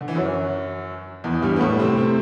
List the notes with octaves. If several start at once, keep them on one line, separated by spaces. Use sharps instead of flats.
D3
E3
F#2 F#3
E2 E3
G2 G3
B3
A2 A3
C3 C4
C3 C4